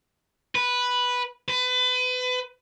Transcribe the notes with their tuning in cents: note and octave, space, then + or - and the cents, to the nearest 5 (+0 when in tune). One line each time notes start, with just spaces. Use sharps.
B4 -5
B4 +30